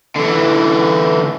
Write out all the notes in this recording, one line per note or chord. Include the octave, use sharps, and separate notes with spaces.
D3 E3